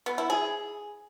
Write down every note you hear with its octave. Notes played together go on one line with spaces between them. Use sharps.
B3
E4
G#4